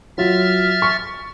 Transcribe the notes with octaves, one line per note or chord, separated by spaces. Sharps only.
F#3 F4 E5 F6 A6
C#6